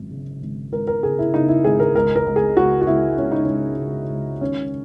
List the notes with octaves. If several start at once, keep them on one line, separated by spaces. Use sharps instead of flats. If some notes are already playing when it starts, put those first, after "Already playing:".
Already playing: G#1 F#2
C#3
G#1
G#1 A#4
A#4
C#3 G#4
E4
C#3 D#4
E4
G#1 G#4
A#4
C#2 A#4
A#4
C#2
G#4
C#2 F#4
F#4
C#2 E4
C#3 C#4
D#4
C#2 C#4
C#3
C#2
D#3 C#4